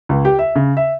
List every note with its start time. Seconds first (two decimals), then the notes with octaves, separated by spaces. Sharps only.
0.09 C#2
0.25 G4
0.39 E5
0.56 C#3
0.77 E5